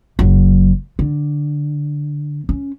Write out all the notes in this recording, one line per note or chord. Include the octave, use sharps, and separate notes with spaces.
F#1 F#3
D3
C#4